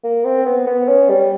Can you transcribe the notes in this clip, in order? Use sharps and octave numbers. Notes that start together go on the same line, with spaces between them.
A#3
C4
B3
B3
C#4
G3